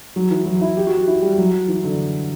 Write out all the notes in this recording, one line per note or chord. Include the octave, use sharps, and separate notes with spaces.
F#3
E3
F#3
E4
G4
F#4
F#4
E4
G3
F#3
E3
D3